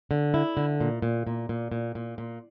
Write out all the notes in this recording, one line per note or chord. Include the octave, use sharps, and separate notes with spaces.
D3
E4
D3
A#2
A#2
A#2
A#2
A#2
A#2
A#2